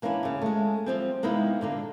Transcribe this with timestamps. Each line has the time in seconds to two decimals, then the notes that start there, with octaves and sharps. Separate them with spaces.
0.02 E3 A#3 C#4 D4 E4
0.23 D#2 C#3
0.41 G#3 A3
0.86 F3 G3 C4
1.23 C3 G#3 A#3 B3 D#4 E4
1.61 A#2 D3 A#3